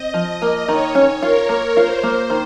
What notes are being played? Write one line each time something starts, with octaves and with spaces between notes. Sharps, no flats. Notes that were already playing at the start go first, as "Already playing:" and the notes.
Already playing: C4 D#5
F3
A#3
D#3 C#5
C#4
F4 A#4
A#3
F4 C5
A#3
D#3